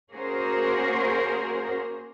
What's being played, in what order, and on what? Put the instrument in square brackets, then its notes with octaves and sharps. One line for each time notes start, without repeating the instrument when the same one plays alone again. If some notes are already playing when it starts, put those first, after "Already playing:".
[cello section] A#3 C#4 F#4 G#4 A#4 C5